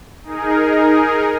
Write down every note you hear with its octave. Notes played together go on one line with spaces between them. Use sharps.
D#4 G#4 A#4